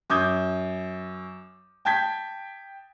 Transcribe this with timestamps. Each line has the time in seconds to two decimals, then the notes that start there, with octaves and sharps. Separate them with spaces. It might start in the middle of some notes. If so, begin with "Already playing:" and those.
0.10 F#2 D6 D#6 G6 G#6
1.85 G5 A5 G6 G#6 B6